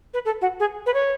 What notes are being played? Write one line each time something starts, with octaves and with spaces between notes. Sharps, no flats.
B4
A4
F#4
G#4
B4
C#5